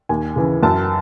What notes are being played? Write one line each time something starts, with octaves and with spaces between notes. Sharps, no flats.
D#2 G#5
C#3 E3
F#2 A5